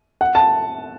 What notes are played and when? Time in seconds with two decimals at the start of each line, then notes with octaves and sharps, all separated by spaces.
0.21 F#5
0.35 A5